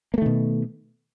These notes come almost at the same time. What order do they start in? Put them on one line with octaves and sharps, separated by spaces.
A#3 A3 D#3 B2